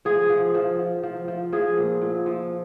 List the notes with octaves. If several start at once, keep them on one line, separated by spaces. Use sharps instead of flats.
F3 G#4
F3
F3
F3
F3
F3
F3 G#4
A#2
A#2
F3